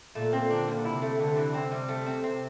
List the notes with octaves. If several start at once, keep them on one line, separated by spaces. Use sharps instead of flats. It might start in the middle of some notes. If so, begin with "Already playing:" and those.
A#2 A3
C4
D3 D4
G3
C3 E4
A3
D3 A3
E3
C3 C4
G3
C3 A3
C4
C4